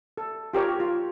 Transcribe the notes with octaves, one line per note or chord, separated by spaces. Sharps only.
A4
F4 G4 A#4 C#5
F4